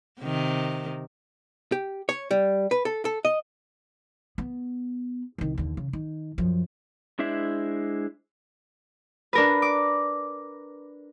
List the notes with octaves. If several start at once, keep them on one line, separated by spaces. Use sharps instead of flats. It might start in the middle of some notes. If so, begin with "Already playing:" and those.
C3 D#3
G4
C#5
G3
B4
A4
A4
D#5
B3
C2 D#3
D#2 D3
C#3
D#3
F#2 F3
G#3 D4 E4 C5 E5
D4 A#4 B4
D6